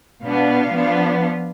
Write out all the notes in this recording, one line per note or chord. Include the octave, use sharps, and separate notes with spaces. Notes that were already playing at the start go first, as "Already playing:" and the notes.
B2 B3 D4 F5
F3 B3 D4